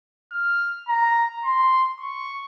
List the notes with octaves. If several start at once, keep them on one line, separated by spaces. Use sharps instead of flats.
F6
A#5
C6
C#6